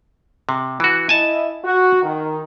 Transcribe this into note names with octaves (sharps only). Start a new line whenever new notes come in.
C3
E3 F#4
E4 D#5 G#5 A5
F#4
D#3